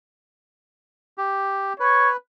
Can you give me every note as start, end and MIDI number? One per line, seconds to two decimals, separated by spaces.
1.18 1.73 67
1.80 2.17 71
1.80 2.10 73